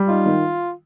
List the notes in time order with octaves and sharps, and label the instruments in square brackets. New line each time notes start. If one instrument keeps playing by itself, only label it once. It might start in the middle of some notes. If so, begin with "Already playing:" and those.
Already playing: [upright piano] G3
[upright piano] D#4 [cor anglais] F4
[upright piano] D#3